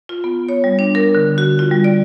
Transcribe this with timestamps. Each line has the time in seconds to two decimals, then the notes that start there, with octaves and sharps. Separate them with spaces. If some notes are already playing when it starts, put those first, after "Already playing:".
0.09 F4
0.24 B3
0.49 C#5
0.64 G3
0.79 D4
0.95 A#4
1.15 D3
1.38 F#4
1.59 F4
1.71 G3
1.84 D5